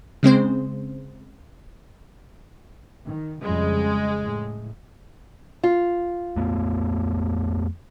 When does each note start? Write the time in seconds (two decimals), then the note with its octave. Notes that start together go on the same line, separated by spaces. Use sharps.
0.23 C#3 G#3 C4 C5
3.06 D#3
3.42 F2 C#3 G3 G#3
4.20 A2
5.63 F4
6.37 F2 A3 B3